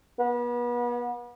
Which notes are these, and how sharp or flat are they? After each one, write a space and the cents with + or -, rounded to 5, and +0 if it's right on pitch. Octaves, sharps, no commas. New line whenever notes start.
B3 -35